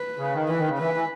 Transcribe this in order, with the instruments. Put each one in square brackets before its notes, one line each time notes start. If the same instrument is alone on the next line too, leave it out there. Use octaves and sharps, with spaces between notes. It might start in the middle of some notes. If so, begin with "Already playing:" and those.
Already playing: [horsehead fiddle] B4
[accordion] C#3
D#3
[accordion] E3 [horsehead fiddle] B4
[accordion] D#3
C#3
[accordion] E3 [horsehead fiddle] B4
[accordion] E3